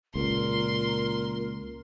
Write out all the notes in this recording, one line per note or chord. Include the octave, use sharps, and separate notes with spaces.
C#2 A#2 A#4 C6